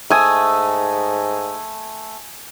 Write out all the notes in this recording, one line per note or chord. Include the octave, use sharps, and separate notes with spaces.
G#2 A3 E5 G#5 D#6